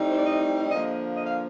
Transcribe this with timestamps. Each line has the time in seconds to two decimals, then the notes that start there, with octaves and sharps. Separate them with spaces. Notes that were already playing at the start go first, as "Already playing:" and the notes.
Already playing: A2 G3 C4 D#4
0.11 C5
0.18 D5
0.26 D#5
0.71 D3 F3 A#3 D#5
1.16 D#5
1.26 F5